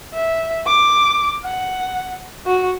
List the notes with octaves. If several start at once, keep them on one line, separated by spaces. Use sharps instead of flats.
E5
D6
F#5
F#4